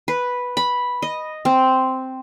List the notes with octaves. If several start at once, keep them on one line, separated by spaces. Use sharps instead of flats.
B4
B5
D#5
C4